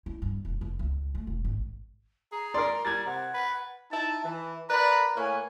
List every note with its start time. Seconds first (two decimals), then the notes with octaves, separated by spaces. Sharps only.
0.06 E4
0.22 G2
0.45 E1
0.61 F1
0.79 C#2
1.15 A3
1.27 E1
1.45 G#1
2.32 G#4 A#5
2.54 A#4 D5 C6
2.85 G3 G#6 A6
3.06 C3 F#5
3.34 B4
3.91 D#4 E4 A5
4.25 E3
4.70 A#4 B4 D5 A#5 B5
5.16 A2 A#3 B4 C#5 G#5